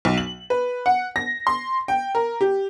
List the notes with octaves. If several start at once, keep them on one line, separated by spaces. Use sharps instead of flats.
B1
F#7
B4
F#5
A#6
C6
G5
A#4
G4